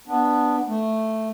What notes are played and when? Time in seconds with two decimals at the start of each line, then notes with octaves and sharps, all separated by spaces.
0.08 B3 D4
0.68 A3